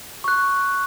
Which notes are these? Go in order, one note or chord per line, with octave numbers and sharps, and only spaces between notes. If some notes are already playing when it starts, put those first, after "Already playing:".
C#6 F#6